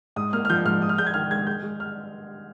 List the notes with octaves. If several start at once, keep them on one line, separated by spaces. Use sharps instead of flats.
G#2 D#6
A#3 F6
F6
F3 G6
G#2 F6
G#2 D#6
F6
G#3 G6
G#6
D#3 F6
G#3 G#6
G#3 G6
G#3
F6